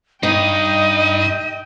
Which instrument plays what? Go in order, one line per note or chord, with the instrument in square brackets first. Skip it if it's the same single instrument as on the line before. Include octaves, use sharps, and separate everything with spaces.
[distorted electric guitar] G2 [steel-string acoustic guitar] D#4 [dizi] D#5 [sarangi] G5